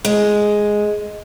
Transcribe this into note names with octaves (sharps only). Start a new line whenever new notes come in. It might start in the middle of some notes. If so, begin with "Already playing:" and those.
G#3